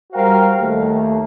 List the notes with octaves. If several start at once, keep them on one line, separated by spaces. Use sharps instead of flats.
G3 F#4 A#4 C5 F5 G5
D#2 A3